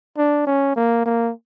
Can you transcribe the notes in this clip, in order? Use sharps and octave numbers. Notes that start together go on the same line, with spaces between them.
D4
C#4
A#3
A#3